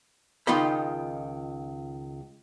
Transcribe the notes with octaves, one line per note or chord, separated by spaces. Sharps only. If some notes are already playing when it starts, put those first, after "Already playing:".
C#2 D#3 D#4 F4 D#5 B5